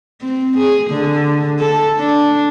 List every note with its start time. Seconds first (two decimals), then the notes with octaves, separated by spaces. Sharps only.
0.22 C4
0.58 G#4
0.90 D3
1.59 A4
1.98 D4